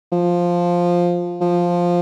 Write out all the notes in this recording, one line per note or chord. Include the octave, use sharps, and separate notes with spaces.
F3
F3